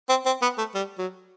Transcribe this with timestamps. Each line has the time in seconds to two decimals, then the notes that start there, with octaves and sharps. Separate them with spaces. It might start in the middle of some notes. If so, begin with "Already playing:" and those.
0.09 C4
0.26 C4
0.42 B3
0.58 A3
0.75 G3
0.99 F#3